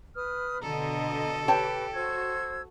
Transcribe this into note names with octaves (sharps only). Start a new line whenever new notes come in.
B4 D#6 F6
B2 D3 A4 D#5 A#5
G4 B4 C#5 G5 A5
F#4 C5 E6 G#6